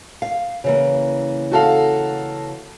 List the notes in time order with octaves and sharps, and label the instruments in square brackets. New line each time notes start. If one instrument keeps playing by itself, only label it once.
[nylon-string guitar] F5
C#3 E3 A#3
[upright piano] F#4 A4 F5